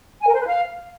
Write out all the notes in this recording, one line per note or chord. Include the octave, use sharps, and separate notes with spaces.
G#5
A#4
C5
B4
F5